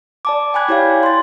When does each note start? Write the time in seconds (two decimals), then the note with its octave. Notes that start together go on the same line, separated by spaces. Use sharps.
0.25 D5 A5 D6
0.54 G5 G#5 B5 F#6 G#6
0.68 E4 G4 C#5 D5 F5 G5
1.03 C6 A6